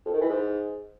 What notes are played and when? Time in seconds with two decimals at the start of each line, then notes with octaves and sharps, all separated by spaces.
0.06 F2
0.13 D#3
0.21 E3
0.29 G#2